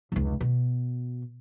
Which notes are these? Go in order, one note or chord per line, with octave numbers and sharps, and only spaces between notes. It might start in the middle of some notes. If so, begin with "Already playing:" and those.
F1 C#2
B2